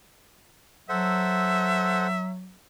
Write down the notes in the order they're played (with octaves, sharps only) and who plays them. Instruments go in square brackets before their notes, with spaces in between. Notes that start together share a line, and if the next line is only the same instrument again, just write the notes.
[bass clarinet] F#3 [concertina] A4 C5 F#5 [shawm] E5